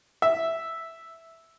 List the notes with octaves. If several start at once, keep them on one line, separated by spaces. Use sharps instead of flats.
E5